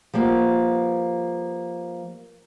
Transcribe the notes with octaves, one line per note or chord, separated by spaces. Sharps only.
F3 G3 A#3 B3